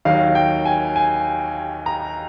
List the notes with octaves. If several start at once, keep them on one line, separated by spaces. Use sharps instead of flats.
D#2 D#3 F#3 F5
G5
G#5
G#5
A#5